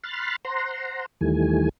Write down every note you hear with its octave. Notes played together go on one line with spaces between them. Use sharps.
B5 C6 F6 F#6 A6
C5 F#5 A#5 C6
D#2 D#3 E3 G3 A3 G#5